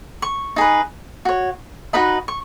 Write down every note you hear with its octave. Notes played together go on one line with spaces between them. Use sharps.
C#6
D#4 G#4 B4
F#4 C#5
D#4 F#4 B4 D#5 B5
C#6